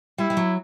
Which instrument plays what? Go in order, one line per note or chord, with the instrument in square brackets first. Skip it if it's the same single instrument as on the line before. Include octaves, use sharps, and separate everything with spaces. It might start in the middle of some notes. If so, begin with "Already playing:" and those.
[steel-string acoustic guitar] G3 [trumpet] E4
[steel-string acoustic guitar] G3
F#3